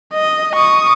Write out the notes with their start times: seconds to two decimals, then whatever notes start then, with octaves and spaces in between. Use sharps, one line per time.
0.14 D#5
0.55 C#6 D#6